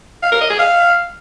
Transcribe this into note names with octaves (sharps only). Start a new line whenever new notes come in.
F5
A#4
D#5
G#4
F5